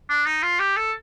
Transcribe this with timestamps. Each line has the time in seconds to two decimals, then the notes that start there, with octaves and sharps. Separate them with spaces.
0.09 D4
0.26 D#4
0.43 F4
0.59 G4
0.77 A4